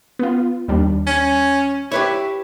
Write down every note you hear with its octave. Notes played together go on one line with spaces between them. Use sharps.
B3 F4
D#2 G3 D4
C#4
E4 G4 B4 C#5